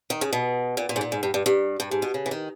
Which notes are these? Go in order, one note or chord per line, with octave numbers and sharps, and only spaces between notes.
D#3
C#3
B2
A#2
A#2
G#2
A#2
G#2
G2
G2
G2
G2
G#2
B2
C#3
E3
D#3